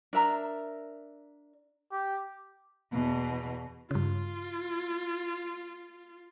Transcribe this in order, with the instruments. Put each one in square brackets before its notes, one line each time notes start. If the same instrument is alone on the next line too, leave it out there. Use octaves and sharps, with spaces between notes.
[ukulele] D4 A#4 E5 A#5
[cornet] G4
[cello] E2 B2
[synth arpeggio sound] G2 C#3 [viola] F4